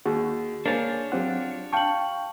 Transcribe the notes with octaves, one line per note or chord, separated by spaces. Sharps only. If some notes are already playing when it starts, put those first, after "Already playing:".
D#2 F#4 G#4
D2 A#3 D4 C5 C#5 G#5 A6
F#3 C4 F4 G4 F#5
F5 G5 A5 C#6 F#7